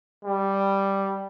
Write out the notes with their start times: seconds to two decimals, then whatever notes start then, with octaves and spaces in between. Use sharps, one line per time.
0.25 G3